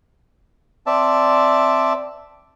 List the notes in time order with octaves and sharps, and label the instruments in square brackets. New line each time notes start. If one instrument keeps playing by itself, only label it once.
[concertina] C4 D5 E5 A5